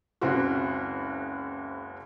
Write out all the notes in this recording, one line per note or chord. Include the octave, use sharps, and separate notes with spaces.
F#1 C#2 C4 F#4